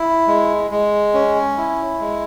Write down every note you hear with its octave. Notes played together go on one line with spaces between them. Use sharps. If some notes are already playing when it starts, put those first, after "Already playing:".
Already playing: E4
G#3
G#3
C#4
E4
G#3